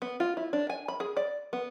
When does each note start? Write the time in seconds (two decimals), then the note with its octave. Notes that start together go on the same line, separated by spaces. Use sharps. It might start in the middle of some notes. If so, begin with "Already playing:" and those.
0.02 B3
0.20 F4
0.37 E4
0.53 D4
0.70 G#5
0.88 B5
1.00 G#4
1.17 D5
1.53 B3